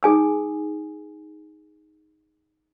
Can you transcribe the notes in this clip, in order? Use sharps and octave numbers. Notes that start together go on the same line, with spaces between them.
D#4 G#4 G#5 D#6